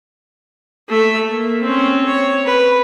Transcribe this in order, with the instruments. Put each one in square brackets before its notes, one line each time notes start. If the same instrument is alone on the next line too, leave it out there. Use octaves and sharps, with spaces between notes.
[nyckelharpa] A3 E5
A#3
C4 C#4
C#5
B4